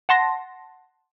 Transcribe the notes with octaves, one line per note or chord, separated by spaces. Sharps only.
F#5 A5 C6 A#6